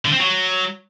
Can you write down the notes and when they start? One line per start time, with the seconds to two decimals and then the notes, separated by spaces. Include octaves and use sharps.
0.05 D3
0.12 C4
0.19 F#3